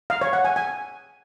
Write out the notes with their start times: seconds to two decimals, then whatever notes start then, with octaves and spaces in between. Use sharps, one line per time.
0.10 F5
0.21 C#5
0.33 F#5
0.45 G#5
0.56 G#5